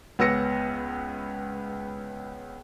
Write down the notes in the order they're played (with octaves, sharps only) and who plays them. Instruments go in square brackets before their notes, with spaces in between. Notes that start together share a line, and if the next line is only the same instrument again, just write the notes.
[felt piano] C#2 B3 C#4 E6 A#6 C#7